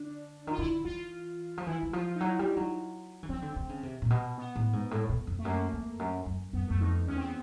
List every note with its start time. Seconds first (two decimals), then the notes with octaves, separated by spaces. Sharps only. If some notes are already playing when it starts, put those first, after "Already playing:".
Already playing: D3 D4
0.47 D#3 F4
0.58 D3 E4
0.85 E3 F4
1.58 F3
1.67 E3 E4
1.83 E3
1.93 F3 F4
2.16 D#4
2.20 F#3 E4
2.39 G3
2.56 F#3
3.23 E3
3.29 F3 C4
3.42 D3
3.56 D3
3.69 C#3
3.83 C3
4.02 A#2
4.10 B2
4.38 B3
4.56 A2
4.73 G#2
4.91 A2
5.09 B2
5.27 F2
5.39 A3
5.45 F#2 A#3
5.73 F2
5.99 F#2
6.26 F#2
6.53 F#2 B3
6.68 F#2 A3
6.81 F2 D#4
7.07 E2 C#4
7.17 C4
7.24 B3